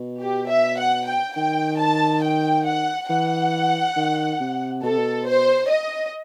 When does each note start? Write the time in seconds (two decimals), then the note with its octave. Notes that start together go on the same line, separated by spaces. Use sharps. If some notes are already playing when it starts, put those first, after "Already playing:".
Already playing: B2
0.21 G4
0.50 E5
0.79 F#5
1.07 G5
1.36 D#3 G5
1.80 A5
2.23 G5
2.67 F#5
3.10 E3 F#5
3.96 D#3
4.40 C3
4.83 B2 A4
4.91 C3
4.98 B2
5.26 C5
5.70 D#5